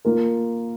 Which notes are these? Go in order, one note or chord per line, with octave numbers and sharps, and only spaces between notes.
A#3 F4 A#4